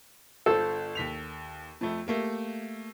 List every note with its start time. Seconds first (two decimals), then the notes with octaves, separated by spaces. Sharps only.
0.46 G1 F4 A4 C5
0.95 D#2 B6 F7
1.81 F2 A3
2.07 A3 A#3 G4